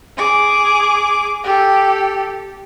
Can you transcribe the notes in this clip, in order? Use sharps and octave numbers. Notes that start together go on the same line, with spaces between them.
G#4 D6
G4 A4